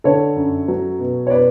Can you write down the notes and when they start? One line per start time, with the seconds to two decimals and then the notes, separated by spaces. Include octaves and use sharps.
0.04 D3 A4 C#5
0.36 F#2
0.68 F#3
0.99 B2
1.27 C#5
1.30 B2 B4 D5